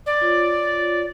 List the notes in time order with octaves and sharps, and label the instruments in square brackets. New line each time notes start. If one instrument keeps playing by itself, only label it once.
[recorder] D5
[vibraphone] F4 C#5